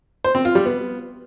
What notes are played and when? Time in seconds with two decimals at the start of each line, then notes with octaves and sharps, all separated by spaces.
0.24 C5
0.35 C4
0.45 F4
0.55 G3
0.66 B3